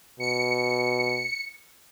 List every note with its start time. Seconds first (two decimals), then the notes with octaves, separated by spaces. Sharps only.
0.20 B2 C#7